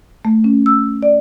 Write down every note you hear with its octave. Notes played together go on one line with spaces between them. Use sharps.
A3
C#4
E6
D5